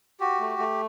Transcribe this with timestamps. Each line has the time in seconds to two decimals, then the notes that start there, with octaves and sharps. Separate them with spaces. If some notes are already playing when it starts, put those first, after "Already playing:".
0.20 F#4 G4
0.40 A3
0.59 A3